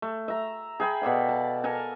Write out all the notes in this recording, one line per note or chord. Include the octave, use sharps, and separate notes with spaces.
A3
E5 A#5
G#4 G5 B5
B2 A4 D5 F5
A5
A4 A#4 G#5 A5